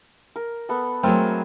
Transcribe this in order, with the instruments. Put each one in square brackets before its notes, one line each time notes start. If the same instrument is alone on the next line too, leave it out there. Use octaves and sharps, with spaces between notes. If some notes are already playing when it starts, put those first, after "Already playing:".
[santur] A#4
B3 A4
[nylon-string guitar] F#3 G#3 A3 [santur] C4 A#4